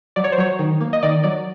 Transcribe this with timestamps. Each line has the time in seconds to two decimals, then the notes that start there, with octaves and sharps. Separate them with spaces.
0.16 F#3 D5
0.24 C#5
0.32 C5
0.38 F#3 C#5
0.59 D#3
0.81 A#3
0.93 D#5
1.03 D#3 D5
1.24 F#3 D5